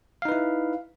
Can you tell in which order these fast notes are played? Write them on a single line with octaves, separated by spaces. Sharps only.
F5 D#4 B4 E4